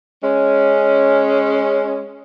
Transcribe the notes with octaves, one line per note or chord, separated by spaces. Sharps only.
G#3 C#4